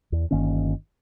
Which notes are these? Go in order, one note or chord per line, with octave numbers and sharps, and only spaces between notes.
E2
G1 D#3 A#3 C#4